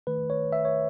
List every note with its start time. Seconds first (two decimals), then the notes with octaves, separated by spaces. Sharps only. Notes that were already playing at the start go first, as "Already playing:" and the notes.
0.07 D#3 A3 B4
0.30 C#5
0.53 E5
0.65 C#5